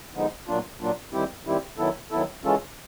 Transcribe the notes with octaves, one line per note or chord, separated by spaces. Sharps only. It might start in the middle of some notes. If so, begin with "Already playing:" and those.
D3 F3 G#3 B3 D#4
A#2 F#3 A#3 D4 F4
A#2 F#3 A#3 D4 F4
D#3 G3 C4 E4 G4
D#3 G3 C4 E4 G4
D#3 F#3 B3 E4 A4
D#3 F#3 B3 E4 A4
E3 G#3 C#4 F4 A4